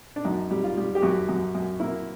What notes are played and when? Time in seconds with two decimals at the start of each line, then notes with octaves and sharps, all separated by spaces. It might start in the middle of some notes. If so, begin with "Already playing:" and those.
0.16 D4
0.25 F#2 D#4
0.51 G3
0.64 F4
0.78 G3
0.95 G4
1.02 F#2 F#4
1.29 F#2
1.55 F#2
1.80 A#3 E4